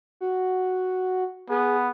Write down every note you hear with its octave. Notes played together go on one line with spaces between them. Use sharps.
F#4
B3 G#4